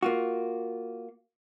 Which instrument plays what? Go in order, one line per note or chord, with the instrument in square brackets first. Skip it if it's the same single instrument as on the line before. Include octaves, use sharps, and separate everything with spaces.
[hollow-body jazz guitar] A#3 F4 F#4